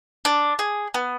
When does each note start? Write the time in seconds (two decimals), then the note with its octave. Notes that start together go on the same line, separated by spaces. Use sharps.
0.25 D4
0.59 G#4
0.94 B3